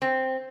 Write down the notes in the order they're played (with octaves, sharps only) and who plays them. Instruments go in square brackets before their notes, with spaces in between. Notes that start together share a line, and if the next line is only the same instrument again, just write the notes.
[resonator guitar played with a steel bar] C4